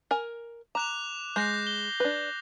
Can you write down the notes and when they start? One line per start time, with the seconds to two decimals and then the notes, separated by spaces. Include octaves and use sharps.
0.11 A#4 G#5
0.75 A#5 D6 F#6 F7
1.36 G#3 G6 A#6 C7
1.67 G7
2.00 D4 B4